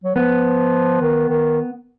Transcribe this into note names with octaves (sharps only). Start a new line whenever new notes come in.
F#3
F3 B3
D#3
D#3